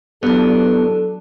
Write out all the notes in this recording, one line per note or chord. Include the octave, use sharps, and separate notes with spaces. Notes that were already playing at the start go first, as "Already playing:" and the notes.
E2 G2 F#3 B3 D4 A4